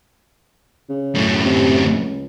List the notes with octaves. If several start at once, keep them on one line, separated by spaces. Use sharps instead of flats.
C#3
F#2 A2
C3
C#2